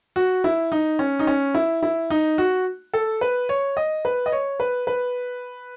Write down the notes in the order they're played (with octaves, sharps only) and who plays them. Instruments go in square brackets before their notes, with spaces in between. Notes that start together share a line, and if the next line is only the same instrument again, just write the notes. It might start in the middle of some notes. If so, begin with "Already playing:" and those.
[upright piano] F#4
E4
D#4
C#4
D#4
C#4
E4
E4
D#4
F#4
A4
B4
C#5
D#5
B4
D#5
C#5
B4
B4